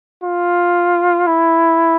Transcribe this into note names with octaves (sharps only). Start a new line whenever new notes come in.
F4
E4